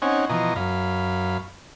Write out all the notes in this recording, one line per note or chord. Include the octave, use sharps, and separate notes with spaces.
C4 C#4 D#4 F#5 G#5
B2 E3 F3 D#5 A#5
F#2 F5 B5